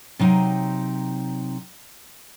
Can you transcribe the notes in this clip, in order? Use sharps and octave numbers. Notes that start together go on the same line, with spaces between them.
C3 F#3 D#4 G5